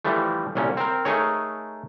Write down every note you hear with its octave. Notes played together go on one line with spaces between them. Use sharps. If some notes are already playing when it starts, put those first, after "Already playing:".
E3 F3 G3 A3
C2 A#2 C#4
C4 A#4
A3 D#4 G#4 A#4 C#5